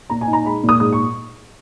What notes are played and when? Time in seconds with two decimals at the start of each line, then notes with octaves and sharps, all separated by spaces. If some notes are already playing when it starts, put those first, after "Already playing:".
0.10 A#2 A#5
0.21 G#5
0.28 D#4
0.33 A#5
0.45 G#3 B5
0.63 A#2
0.69 D#6
0.80 G#2 D#6
0.92 C#6